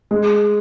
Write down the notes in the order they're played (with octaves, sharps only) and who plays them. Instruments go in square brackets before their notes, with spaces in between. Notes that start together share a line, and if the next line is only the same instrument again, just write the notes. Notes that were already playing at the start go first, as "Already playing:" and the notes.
[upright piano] G#3